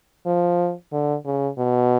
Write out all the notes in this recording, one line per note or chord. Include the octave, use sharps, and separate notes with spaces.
F3
D3
C#3
B2